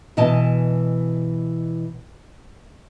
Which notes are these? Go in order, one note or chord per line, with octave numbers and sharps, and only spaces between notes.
B2 E3 D#5 G#5 A5